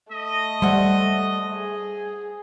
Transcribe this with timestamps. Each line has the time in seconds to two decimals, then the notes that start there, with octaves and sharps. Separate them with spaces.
0.12 A3 D#5
0.62 G3 C5 E5 F#5
1.54 G#4